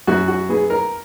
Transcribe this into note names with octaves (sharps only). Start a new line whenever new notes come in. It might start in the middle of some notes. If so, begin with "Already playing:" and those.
F#2 F#4
F#4
B3 G#4
A#4